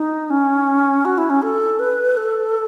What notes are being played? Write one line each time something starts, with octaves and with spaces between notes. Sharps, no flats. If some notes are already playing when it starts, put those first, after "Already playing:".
Already playing: D#4
C#4
F#4
E4
C#4
A4
B4
A4